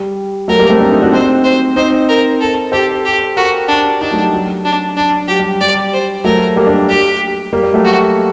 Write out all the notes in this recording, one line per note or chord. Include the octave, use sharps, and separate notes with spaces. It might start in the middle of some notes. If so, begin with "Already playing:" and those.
Already playing: G3
F#3 A3 A#4
G3 A#3
A3 C4
A#3 D4
C4 D#4
D4 F#4
C4 D#4 C5
C5
C4 D#4 C5
A#4
A4
G4 A4 C5
G4
F#4 G4 A#4
D4
D4 D#4 G4
F#3 A3
G3
F#3
D4
D4
F#3 G4
G3
G3 D5
C5
F#3 A3 A#4
G3 A#3
A#3 D4
G4
G3 A#3
G3
F#3 A3
F#4